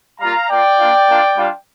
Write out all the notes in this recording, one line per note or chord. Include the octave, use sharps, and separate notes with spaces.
G3 A#3 F4 F5 A#5
A#3 F4 D5 G5
A#3 D4 F4
A#3 D4 F4
G3 D4 F4